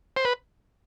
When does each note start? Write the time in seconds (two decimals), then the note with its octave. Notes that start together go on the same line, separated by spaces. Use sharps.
0.17 C5
0.25 B4